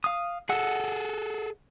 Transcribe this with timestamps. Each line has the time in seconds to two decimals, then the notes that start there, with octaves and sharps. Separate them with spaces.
0.04 F5 D#6
0.49 G#4 A4 D#5 F#5 E6